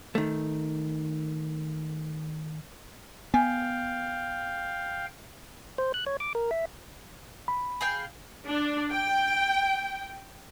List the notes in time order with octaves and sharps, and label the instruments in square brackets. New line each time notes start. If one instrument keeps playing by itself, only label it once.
[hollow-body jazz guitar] D#3 A3
[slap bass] B3 [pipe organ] F5 G5 [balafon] G#5
[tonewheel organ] C5
F#6
C#5
D6
A#4
E5
[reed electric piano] B5
[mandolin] G#4 F5 G5
[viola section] D4
G5